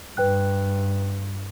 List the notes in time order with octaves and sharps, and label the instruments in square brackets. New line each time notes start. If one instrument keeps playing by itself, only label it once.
[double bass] G2 [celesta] B4 G5 F#6